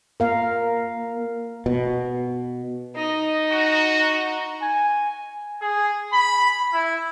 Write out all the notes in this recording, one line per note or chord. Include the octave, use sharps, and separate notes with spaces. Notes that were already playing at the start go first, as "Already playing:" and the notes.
A#3 A#4 F5
B2
D#4 D#5
F#4
G#5
G#4
B5
E4